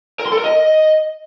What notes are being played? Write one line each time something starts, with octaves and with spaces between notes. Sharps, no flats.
A#4
C6
A4
A#4
D#5